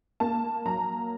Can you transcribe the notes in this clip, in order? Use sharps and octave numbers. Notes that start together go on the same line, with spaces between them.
A#3 A5
F#3 A#5